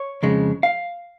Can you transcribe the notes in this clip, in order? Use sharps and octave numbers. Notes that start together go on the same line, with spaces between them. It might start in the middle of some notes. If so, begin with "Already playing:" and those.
Already playing: C#5
F2 C#3 G#3
F5